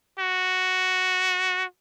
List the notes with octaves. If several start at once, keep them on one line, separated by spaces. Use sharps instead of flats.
F#4